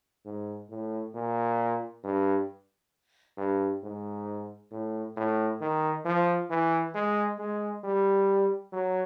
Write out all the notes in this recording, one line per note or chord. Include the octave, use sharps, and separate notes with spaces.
G#2
A2
A#2
G2
G2
G#2
A2
A2
D#3
F3
E3
G#3
G#3
G3
F#3